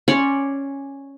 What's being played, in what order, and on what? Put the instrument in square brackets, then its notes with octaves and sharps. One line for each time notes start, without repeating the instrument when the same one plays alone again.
[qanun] C#4 C#5 D5 C6